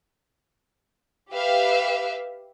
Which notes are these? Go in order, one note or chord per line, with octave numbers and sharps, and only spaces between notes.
G4 B4 E5 F5